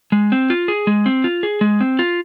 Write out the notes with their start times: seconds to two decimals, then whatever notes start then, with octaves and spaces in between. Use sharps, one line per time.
0.12 G#3
0.32 C4
0.50 F4
0.68 G#4
0.87 G#3
1.06 C4
1.24 F4
1.43 G#4
1.61 G#3
1.81 C4
1.99 F4